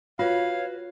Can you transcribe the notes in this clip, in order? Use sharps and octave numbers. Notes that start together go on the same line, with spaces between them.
F4 F#4 B4 C#5 F5